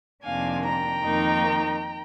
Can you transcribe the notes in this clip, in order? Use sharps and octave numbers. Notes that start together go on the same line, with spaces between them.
F2 C3 D#3 A#3 D4 F5 G#5
G5 A#5
F2 D#3 A#3 D#4